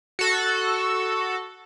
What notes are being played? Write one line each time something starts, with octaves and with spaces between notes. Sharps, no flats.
F#4 A4